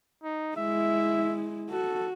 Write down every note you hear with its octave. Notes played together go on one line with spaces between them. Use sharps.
D#4
G#3 E4 E5
F#4 A4